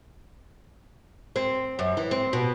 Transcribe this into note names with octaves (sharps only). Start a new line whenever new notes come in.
C4
F#2
E3
C4
B2